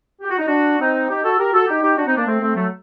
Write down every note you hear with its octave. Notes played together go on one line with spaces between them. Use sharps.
G4
F#4
D#4
D4 F#4
C4 D#4
D#4 G4
F#4 A4
G4 A#4
F#4 A4
D#4 G4
D#4 G4
D4 F#4
C4 D#4
A#3 D4
A3 C4
A3 C4
F#3 A3